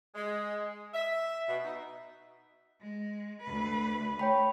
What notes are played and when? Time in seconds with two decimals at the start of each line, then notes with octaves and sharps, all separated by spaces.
0.15 G#3
0.94 E5
1.48 B2
1.65 D#4
2.81 G#3
3.43 D2 B4
4.19 C#5 G5 B5